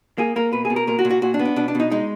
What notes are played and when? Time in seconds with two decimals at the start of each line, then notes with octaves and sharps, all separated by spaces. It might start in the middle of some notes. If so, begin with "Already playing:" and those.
0.18 A#3 G#4
0.36 A#3 A#4
0.53 B2 B4
0.65 G#4
0.70 B2
0.76 A#4
0.87 A#2 A#4
0.99 F#4
1.05 A#2
1.10 F#4
1.22 A#2 F#4
1.34 D4
1.39 B3
1.45 D4
1.56 B2 D4
1.68 D4
1.75 B2 D#4
1.91 G#3 D#4